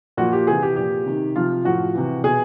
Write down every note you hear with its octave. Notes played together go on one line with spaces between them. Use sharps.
A#2 F3 F#4
G4
C3 E3 G#4
G4
A#2 F3 G4
C3 D#3
C3 F3 F4
A2 F3 F#4
C3 E3
B2 G#4